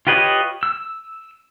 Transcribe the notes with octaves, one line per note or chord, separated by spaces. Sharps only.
F4 G4 B4 C#5 D#5
E6